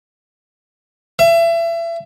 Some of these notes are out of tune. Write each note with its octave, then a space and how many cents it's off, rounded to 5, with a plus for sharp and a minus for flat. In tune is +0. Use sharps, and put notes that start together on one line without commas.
E5 +30